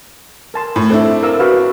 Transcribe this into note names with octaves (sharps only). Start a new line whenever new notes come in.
A#4 A5 C6
A2
C4 D4 E4 A4
A#4 F5 E6
F#4 B4 F5